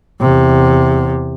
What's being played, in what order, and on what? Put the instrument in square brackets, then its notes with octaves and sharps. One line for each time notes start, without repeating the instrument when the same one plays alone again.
[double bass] E2 C3